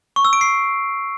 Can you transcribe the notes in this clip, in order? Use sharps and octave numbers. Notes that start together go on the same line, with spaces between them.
C#6
E6
D7
C7